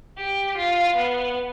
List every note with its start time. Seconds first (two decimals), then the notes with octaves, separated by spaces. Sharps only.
0.18 G4
0.57 F4
0.96 B3